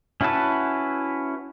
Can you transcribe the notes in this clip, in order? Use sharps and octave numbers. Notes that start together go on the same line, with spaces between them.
C#4 E4 F#4 B4 A5